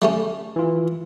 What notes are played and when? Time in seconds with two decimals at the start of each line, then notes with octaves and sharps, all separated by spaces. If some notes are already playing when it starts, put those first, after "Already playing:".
0.02 G3 A3 C#4
0.56 E3 F4